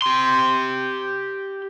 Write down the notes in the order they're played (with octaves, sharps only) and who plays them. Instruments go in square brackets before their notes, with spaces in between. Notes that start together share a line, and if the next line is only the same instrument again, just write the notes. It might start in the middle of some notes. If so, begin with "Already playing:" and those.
[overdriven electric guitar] G4 C6